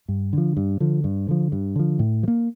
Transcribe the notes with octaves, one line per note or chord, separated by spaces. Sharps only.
G2
D3 F3
G2
D3 F3
G2
D3 F3
G2
D3 F3
A2
F3
A#3